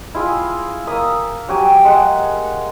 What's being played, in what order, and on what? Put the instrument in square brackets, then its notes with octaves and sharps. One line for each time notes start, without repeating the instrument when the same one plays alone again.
[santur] E4 F4 G#4
A#3 E5 D#6
F#3 G4 G#5
G#3 F#5